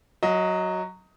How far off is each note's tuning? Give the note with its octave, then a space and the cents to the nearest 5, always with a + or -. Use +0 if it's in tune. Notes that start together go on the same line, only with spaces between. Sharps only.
F#3 +0 D#5 +20 F#5 -40